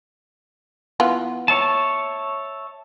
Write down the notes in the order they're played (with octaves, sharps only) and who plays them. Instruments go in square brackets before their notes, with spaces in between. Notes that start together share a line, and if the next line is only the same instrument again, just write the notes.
[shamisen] E3 B3 F4
[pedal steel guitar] C#5 E5 A5